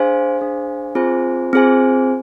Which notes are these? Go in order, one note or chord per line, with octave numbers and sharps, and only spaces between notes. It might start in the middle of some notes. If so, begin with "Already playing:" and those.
Already playing: D4 G#4 C5 F5 G#5
D4 G#4 C5 F5 G#5
C4 F4 G#4 C5 G#5
C4 F4 G#4 C5 G#5